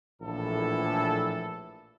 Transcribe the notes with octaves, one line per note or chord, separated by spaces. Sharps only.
A#1 A2 E3 A4